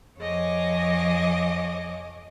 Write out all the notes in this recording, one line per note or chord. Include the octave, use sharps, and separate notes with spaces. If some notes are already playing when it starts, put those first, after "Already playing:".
F2 F3 C#5 D#5 G#5 D6